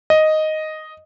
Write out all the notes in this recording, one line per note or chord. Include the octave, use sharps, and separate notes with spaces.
D#5